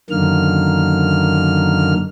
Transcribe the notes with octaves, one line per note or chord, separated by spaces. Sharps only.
F#2 D3 D#3 A#3 F6